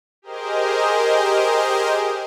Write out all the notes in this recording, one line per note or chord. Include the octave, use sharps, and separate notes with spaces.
G4 G#4 A#4 C5 D#5